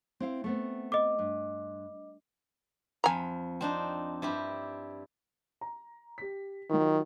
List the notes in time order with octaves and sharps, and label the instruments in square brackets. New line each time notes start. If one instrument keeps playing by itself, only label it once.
[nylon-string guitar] C4 E4 F5
A3 B3 C4
[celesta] D#5 D6
[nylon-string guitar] G2
[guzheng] F2 B5 [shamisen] G#5 A#5
[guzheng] C4 D4 D#4
G2 E4 G4
[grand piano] A#5
G4 B6
[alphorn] D#3 [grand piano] F#3 D#4 F4